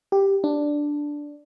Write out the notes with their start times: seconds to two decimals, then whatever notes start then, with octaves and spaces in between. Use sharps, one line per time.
0.12 G4
0.44 D4